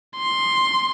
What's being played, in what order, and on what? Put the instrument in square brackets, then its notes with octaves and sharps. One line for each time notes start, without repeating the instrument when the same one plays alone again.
[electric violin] C6